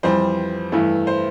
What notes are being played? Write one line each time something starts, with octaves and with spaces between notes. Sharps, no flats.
F2 E3 G3 C5
G2 E3 A3 E4
C5